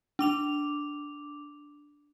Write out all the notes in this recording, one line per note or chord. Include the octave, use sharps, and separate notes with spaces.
D4 D6 F7